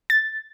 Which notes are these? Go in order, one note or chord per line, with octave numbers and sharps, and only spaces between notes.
A6